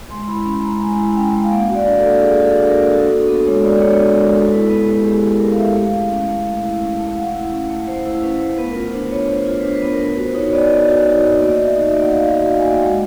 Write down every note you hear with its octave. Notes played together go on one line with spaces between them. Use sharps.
G#3 C6
E4 B5
C#4 B5
G#3 A#5
G#3 G#5
E4
C#4 G5
G#3
F5
A#3 F#5
F#4
D5
D4
A4
A#3
A#3 G#4
F#4
A4
D4
A#4
A#3
F#4 A4
D4 A4
B3 A4
G#3 C#5
F#4 D5
D4 C#5
B3
G#3 A#4
G#3 A4
E4 B4
B3 B4
G#3 G4
G4
G#3 G#4
E4 A4
B3 A#4
F5
G#3 E5
A3 F5
E4
C#4
A3
A3
E4
C#4
A3
F5
A3 F#5
E4 F#5
C#4 F#5
A3
A3 C5
E4 C5
C#4 B4
A3 C5
B3 B4
A#4
F4 B4
D4 C5
B3 C#5
B3 C5
F4
C5
B4
D4 C5
B4
B3
A#4
B3 B4
F#4 C5
D#4 C#5
C#5
B3 D5
B3 D#5
F#4
D#4
B3
D5
A#3 D#5
F#4
E5
D#4 D#5
E5
A#3
F#5
A#3 F5
F#4
F5
D#4
G#5
A#3 G5
G#3 F#5